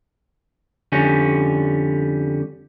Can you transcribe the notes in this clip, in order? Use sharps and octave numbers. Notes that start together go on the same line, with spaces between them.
F2 D3 G3 C#4